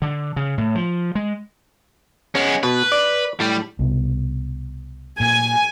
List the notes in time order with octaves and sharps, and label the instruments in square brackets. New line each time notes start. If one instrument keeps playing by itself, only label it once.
[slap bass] D3
C#3
A2
F3
G#3
[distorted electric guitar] G#3 B3 [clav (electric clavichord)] C#4
[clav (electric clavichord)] B2 [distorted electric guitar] B4
[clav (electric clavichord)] D5
[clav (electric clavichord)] A2 [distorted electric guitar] G3
[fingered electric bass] C2 B2
[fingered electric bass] A#2 [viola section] G#5